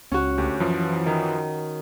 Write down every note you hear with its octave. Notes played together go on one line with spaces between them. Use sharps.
C#2 C#4 F#4
D2 G4
F#2 E3 F3
D#3